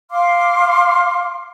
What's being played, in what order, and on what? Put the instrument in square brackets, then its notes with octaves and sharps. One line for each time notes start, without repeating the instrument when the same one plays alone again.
[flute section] F5 C6 D6 F6